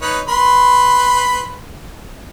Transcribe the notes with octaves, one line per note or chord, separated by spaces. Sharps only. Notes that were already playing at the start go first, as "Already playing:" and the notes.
D#4 B4 C#5
B4 B5 C6